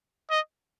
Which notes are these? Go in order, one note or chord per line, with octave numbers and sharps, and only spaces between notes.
D#5